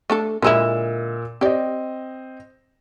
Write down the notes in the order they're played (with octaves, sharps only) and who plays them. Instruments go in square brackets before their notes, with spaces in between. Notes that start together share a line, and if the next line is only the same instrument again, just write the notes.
[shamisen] A3 D4 A4
[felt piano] A#2 E6 E7 [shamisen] D3 G#3 E4
[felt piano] C4 D#5 [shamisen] G4 D5